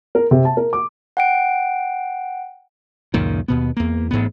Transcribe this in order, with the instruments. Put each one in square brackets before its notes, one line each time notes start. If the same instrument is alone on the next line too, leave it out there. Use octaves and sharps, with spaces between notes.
[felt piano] A#4
C3
A5
A#4
D6
[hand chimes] F#5 G5 D7
[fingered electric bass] C#2 F#2 A#2 D#3
D#2 B2 B3
E2 A#3
A1 G#2 B2 B3